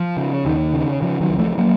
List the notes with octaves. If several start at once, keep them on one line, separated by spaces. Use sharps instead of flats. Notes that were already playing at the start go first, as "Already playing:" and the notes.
Already playing: F3
C#3
D#2 D#3
C#3
C#3 F3
D#3 F#3
C#2
F3 A3
F#3 A#3